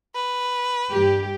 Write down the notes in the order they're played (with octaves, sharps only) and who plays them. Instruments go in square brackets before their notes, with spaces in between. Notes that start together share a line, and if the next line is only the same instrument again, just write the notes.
[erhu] B4
[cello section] G2 G4